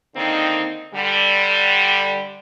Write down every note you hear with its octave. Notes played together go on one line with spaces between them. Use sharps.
D3 D#3 A#3 C4 D#4
D3 G3